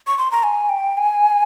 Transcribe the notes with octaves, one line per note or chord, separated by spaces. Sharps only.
C#6
C6
A#5
G#5
G5
G#5